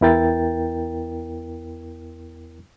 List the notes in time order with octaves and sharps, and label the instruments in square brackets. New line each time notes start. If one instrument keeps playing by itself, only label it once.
[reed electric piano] E2 B3 E4 A#4 G5 A6